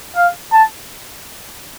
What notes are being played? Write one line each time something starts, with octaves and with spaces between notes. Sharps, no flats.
F5
A5